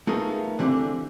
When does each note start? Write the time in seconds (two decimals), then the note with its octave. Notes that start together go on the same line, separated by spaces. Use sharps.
0.07 A3 B3 D#4 F4 G#4 A#4
0.59 D3 E3 C4 G4